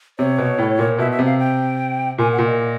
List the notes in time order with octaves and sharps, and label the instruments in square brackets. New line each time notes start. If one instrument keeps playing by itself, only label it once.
[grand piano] C3 [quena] C#5
[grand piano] B2
A2
A#2
[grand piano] B2 [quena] E5
[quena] E5
[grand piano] C3
[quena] F5
G5
[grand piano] A#2 [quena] G#5
[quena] F#5
[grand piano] A#2
[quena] D#5